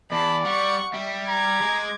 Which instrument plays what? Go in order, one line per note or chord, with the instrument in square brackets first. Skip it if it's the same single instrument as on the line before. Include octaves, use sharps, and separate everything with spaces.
[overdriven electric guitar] E2 [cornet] D5 [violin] A5 B5
[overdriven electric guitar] G3 [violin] F#5 C#6
[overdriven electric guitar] G3 [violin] E5
[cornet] A#5 [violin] D6 G#6
[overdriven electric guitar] G#3